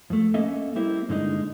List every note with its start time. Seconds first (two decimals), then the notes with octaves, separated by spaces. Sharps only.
0.10 F2 A3
0.34 A#3 C#4 A4 D#5 E5
0.75 G3 A#3 C4 E4
1.09 G2 D3 G#3 D#4